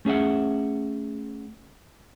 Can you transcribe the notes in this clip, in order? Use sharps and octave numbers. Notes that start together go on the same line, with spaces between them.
A3 C#4 G#4 E5 F#5